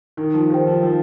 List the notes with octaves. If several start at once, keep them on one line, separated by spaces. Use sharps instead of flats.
D#3 D#4
F3
D#3 G4 C5 G5
F3
F3 D#4